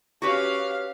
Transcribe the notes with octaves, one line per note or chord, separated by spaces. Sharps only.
C#4 F#4 G4 B4 F5